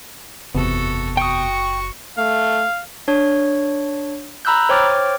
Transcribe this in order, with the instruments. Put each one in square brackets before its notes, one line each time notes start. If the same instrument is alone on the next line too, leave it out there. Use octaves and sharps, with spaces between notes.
[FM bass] F#1 [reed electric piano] E2 C3 B3 [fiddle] F#4 A4
[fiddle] F#4 C#6 [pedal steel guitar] G5 D#6
[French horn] A3 [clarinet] F5
[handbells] D4 C#5
A#5 B5 E6 F#6 G6
C5 C#5 G5 D6 F6 A6